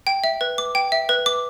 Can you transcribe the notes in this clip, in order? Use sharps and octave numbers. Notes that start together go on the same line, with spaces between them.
G5
E5
B4
D6
G5
E5
B4
D6